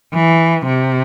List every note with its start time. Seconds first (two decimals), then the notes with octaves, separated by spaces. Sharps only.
0.14 E3
0.66 C3